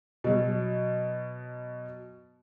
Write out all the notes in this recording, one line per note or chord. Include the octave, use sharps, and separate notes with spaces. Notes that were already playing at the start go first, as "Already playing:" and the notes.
B2 F#3